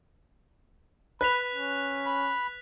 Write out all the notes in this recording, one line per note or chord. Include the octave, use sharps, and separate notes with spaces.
B4 B5 F#6 B6 F7
C#4
B5